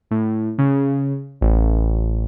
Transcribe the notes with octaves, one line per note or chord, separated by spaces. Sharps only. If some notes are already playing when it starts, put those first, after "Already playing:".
A2
C#3
A1